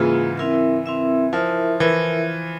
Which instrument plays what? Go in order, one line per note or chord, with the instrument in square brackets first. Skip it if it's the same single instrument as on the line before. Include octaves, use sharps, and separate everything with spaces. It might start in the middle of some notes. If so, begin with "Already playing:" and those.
Already playing: [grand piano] G#2 C#3 E3 [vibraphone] A#3 F4 G#4
[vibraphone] C4 E4 A#4 E5
C4 E4 A#4 E5
[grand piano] F3 [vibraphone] E4 A#4 E5
[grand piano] E3 [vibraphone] E4 A#4 E5